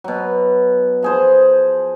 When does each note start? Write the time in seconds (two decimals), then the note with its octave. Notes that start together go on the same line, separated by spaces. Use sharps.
0.04 B2 F#3
1.03 F3 G#4 C5